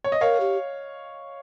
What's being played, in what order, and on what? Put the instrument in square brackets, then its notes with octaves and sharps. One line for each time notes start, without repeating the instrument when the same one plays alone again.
[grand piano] C#5
D#5
[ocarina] A#4 [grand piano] C#5 F5
[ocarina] G4